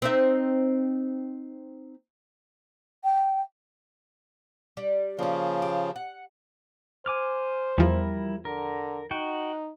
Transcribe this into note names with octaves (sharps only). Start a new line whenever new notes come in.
C4 D#4 E5
G5
G3 D4
C#3 F3 A#3 C#4
G4
F#5
C5 G#5 D6 F6
E2 F3 G3 E4 A#4
D3 A#4
D#4 F#4 F#5 G5